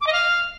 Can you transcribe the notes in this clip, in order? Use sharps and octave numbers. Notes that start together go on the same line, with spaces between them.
D6
D#5
F5